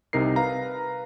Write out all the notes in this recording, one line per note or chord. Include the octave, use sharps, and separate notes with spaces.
C2 C3 D#4 A#4 C7
B4 F5 A#5